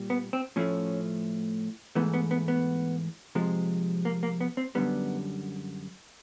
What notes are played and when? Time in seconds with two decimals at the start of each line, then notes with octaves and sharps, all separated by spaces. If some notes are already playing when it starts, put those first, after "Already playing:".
Already playing: A#2 G3
0.10 B3
0.33 C4
0.56 A2 F3 A3 C#4
1.95 G#2 E3 A3 B3
2.14 B3
2.31 B3
2.48 B3
3.35 C3 F3 G#3
4.05 A#3
4.23 A#3
4.41 B3
4.57 C4
4.75 F#2 D3 G3 B3